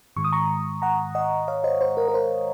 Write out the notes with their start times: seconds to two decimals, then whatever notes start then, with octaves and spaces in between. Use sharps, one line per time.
0.16 G#2 D#3 G#3 C#6
0.24 D#6
0.33 A#5 C#6
0.82 F#5 A#5
1.15 D#5 F#5
1.48 C#5 F5
1.64 C5 D#5
1.81 C5
1.97 A#4
2.08 A#4
2.14 C5